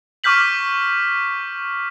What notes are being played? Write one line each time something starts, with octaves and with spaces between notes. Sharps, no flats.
C#6 D6 F6 G6 B6 F#7